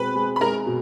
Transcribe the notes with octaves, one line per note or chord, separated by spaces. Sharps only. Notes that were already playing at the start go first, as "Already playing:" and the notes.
Already playing: B2 G#3 C4 B4 B5
G#3
B5
G#3 A#4 A#5
B2